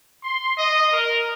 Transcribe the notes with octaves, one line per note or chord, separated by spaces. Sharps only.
C6
D#5
A#4